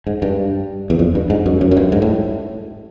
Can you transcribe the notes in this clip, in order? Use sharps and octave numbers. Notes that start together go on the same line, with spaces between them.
G#2
G2
E2
F2
G2
G#2
F#2
F#2
F#2
G2
G#2
A2